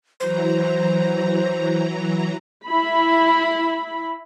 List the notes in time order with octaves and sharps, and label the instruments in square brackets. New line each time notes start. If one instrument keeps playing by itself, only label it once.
[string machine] E3 F#3 A#5 [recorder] C5
[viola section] E4 B5